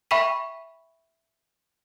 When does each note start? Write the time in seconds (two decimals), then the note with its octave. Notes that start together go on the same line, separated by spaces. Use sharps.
0.11 E5 G5 B5 C#6 B6 D#7